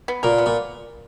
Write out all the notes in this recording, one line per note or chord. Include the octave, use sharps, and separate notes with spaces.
B3
A#2 A#4
B3
A#2